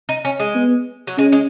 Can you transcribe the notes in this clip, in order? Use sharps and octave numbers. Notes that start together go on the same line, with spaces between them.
D#4
C#4
G#3
B3
F#3
G#3 C#4
G#3